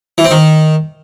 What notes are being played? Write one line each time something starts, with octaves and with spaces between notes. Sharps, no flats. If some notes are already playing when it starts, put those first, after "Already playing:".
E3
C4
D#3